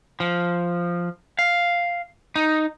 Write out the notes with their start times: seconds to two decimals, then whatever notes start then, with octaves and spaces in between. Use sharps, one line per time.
0.20 F3
1.39 F5
2.36 D#4